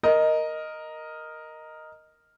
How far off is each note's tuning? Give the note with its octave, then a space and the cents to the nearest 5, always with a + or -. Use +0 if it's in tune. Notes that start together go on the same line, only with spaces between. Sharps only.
A#4 +0 D#5 +0